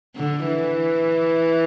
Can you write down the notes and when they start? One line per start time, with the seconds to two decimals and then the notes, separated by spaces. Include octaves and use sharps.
0.16 D3
0.47 E3